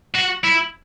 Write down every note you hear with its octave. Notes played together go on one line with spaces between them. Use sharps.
F#4
E4